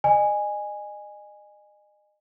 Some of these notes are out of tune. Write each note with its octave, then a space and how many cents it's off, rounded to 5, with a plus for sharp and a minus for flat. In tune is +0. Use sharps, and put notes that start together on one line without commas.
D#5 -35 G#5 -10